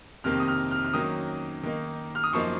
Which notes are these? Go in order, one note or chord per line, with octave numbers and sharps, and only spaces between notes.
F2 C3 D#3 A#3 F6
D#6
F6
F6
F6
D#3 F#3 A#3 C#4 D#6
D#3 A#3 D#4
F6
D#6
F#2 F3 A#3 D#4 C#6